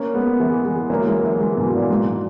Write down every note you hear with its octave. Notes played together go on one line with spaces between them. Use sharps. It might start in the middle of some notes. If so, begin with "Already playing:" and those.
Already playing: A#3 C#4
G#3 B3
E3 G#3
E3 G#3
F#3 A#3
E3 G#3
E3 G#3
E3 G#3
G#2 B2
A#2
G#2